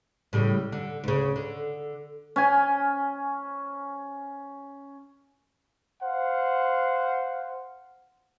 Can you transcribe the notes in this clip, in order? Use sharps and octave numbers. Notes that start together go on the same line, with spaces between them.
A2 C#3 G3
D3
D2 C#3
D3
C#4 G#5
C5 F5 F#5